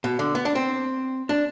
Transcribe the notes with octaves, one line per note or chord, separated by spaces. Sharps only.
B2
D3
B3
D4
C4
D4